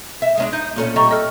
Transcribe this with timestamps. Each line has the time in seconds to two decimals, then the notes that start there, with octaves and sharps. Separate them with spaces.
0.22 E5
0.38 G#3 C#4 D4
0.53 D#4 G6
0.76 A#2 A3 C#4
0.96 G3 D#5 E5 A#5 C#6
1.11 A4 D#5 F6